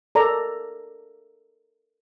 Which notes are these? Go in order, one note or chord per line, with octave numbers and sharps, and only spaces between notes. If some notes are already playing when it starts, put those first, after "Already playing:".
A4 A#4 D5 A#5